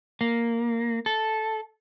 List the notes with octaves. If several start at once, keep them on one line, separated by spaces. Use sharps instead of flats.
A#3
A4